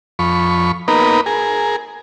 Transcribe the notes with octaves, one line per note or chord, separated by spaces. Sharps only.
F2 B5 C#6
A#3 B3 D#4 A#4 B4
G#4 A#4